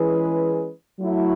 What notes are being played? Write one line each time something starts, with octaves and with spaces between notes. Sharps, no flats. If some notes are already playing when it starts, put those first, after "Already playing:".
Already playing: E3 G#3 C#4 G#4 B4
F#3 A3 E4